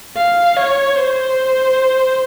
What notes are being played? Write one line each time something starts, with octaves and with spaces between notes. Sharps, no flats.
F5
C#5
C5